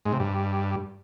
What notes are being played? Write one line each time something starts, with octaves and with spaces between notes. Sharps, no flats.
G#2
C3
G2